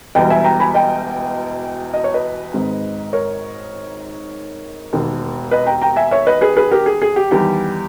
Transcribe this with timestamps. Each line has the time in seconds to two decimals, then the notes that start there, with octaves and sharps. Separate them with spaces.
0.15 E1 E2 B2 G3 D#5 G5
0.30 E5 G#5
0.44 G5 A#5
0.60 G#5 B5
0.74 D#5 G5
1.94 D#5
2.04 C#5
2.14 B4 D#5
2.53 G#1 G#2 D#3 G#3
3.13 A#4 C#5
4.93 E1 D#2 D#3
5.51 B4 D#5
5.66 G5 A#5
5.82 G5 A#5
5.96 E5 G#5
6.11 C#5 E5
6.27 B4 D#5
6.41 G#4 B4
6.56 G#4 B4
6.71 G4 A#4
6.86 G#4
7.02 G#4
7.16 G4
7.31 E2 D#3 G3 G4